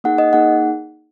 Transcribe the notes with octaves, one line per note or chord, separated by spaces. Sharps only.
A#3 D#4 G#4 F#5
D#5
A#3 D#4 G#4 F#5